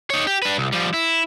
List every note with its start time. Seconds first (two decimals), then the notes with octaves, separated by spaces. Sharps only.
0.10 D#4 C#5
0.27 G4
0.42 D4 B4
0.58 C2
0.72 F3 G3
0.94 E4